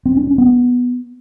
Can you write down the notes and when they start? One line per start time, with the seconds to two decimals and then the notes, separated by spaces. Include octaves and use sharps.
0.06 C4
0.16 D4
0.27 C#4
0.38 B3